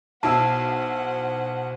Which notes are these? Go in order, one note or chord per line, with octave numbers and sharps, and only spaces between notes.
B1 E4 C5 F#5 A5 E6